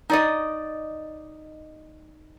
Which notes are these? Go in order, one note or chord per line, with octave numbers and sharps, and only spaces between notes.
D#4 D5 D#5